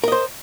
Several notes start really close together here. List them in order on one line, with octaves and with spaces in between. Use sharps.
A#4 D#5 C5